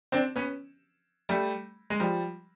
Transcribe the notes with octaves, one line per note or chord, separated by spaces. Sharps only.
C4 D4
B3 C#4
G3 A3
G#3
F3 G3